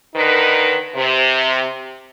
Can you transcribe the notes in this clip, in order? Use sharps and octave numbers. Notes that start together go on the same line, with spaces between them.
D3 D#3 D#4 A#4 B4
C3